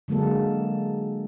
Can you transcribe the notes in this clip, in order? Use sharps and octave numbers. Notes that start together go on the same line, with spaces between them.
D3 F#3 G#3 A#3 A4